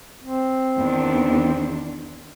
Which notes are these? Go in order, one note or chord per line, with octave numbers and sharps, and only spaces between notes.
C4
E2 D#3 D4